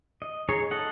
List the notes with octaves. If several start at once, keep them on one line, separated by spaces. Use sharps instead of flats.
D#5
D#4 G#4 C#5
A4 D#5 F#5